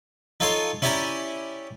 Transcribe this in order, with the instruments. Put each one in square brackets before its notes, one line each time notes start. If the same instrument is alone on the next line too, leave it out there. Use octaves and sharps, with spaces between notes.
[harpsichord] D#4 F4 A4 C#5 G#5 C6
C#4 E4 G4 D5 G#5 A#5